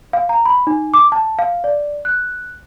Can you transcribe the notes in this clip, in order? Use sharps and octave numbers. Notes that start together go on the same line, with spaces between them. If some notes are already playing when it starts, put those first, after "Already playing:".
F5
A#5
B5
D#4
D6
A5
F5
D5
F#6